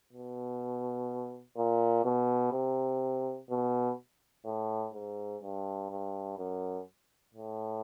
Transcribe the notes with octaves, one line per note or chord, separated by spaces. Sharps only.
B2
A#2
B2
C3
B2
A2
G#2
G2
G2
F#2
A2